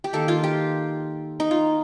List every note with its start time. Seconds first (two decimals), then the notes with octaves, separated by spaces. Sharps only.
0.04 G4
0.13 D#3 A#3 A4
0.28 F4
0.44 G4
1.40 D#4
1.51 F4